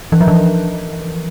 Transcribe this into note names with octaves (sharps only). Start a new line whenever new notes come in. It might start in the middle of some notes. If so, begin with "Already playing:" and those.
E3
F3
E3